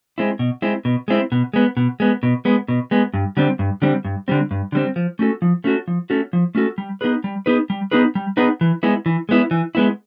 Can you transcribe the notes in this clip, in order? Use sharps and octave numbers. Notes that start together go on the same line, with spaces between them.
G#3 C4 E4
B2
G#3 C4 E4
B2
G#3 C4 E4
B2
G#3 B3
B2
G#3 B3
B2
G#3 B3
B2
G#3 B3
G2
D3 G3 C4
G2
D3 G3 C4
G2
D3 G3 C4
G2
D3 G3 C4
F3
A3 C#4 F#4 A4
F3
A3 C#4 F#4 A4
F3
A3 C#4 F#4 A4
F3
A3 C#4 F#4 A4
G3
B3 D#4 G#4 B4
G3
B3 D#4 G#4 B4
G3
B3 D#4 G#4 B4
G3
B3 D#4 G#4 B4
E3
G#3 B3 E4
E3
G#3 B3 E4
E3
G#3 B3 E4